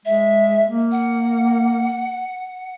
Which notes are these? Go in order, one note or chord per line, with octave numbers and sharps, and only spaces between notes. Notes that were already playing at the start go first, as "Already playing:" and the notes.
G#3 E5
A#3
F#5